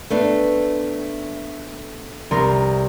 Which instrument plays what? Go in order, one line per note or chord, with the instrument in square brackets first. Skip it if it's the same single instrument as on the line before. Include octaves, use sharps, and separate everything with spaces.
[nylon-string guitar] A3 B3 D4
[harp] C2 A#4 C6